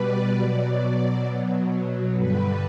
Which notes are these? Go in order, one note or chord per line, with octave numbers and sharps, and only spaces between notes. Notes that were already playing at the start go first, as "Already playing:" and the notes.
Already playing: B2 G3 B4 D5
B2 F#3
B2 F#3
G2 D3 G3 B4